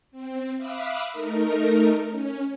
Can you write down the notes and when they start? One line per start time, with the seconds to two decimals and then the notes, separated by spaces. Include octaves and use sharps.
0.11 C4
0.57 E5 F5 B5 D6 D#6 F#6
1.12 A3 D#4 A#4
2.08 C#4